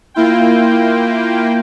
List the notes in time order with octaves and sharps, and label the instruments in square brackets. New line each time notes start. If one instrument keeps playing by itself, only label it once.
[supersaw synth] A#3 E4 F4 G5